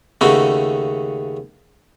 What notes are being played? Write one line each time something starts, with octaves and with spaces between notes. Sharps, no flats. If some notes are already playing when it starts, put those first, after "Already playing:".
D#2 C#3 A3 C#4 F#4